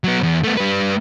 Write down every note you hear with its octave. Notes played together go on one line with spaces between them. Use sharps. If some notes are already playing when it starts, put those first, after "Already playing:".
F#3 B3
E2
A3 B3
G3 B4